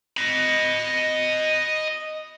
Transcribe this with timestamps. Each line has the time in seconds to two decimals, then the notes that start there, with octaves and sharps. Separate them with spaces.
0.17 D#5 B5